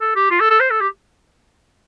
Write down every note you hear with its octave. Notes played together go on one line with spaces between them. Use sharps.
A4
G4
F4
A4
A4
C5
A4
G4